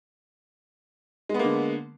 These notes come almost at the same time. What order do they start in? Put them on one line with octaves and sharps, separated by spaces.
G#3 B3 A#3 D3